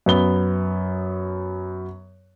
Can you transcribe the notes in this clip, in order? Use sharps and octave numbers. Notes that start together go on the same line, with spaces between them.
F#2 B3 G7